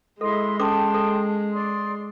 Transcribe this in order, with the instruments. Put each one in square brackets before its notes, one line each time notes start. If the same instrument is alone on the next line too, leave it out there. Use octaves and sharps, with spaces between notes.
[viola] G#3 [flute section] E4 D#5 C6 [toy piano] A4
[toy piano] C#4 A4 D6 [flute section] G5 A5 C6
[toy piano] A4
[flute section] D5 C6 D#6